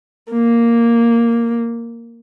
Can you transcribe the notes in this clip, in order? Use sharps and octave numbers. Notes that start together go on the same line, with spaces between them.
A#3